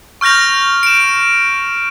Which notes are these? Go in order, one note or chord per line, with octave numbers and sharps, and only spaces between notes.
C#6 F6 G6 A#6 F7
D7 E7